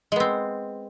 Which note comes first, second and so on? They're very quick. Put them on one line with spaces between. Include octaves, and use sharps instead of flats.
G#3 B3 C4